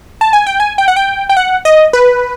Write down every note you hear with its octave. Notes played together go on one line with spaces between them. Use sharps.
A5
G#5
G5
G#5
G5
F#5
G5
G5
F#5
D#5
B4